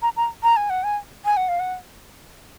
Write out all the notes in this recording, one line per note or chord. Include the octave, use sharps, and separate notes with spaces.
A#5
A#5
A#5
G#5
F#5
G#5
G#5
F#5
F5
F#5